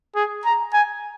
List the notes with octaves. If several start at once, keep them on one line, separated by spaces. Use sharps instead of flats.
G#4
A#5
G#5